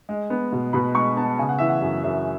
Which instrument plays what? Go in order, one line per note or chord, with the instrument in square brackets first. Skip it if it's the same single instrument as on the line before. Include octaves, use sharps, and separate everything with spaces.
[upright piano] G#3
B3
B2
B2 B5
G#3 C#6
B3 A5
C#3 G#5
F#5
E3 E5
F#5
F#2
F#2 E5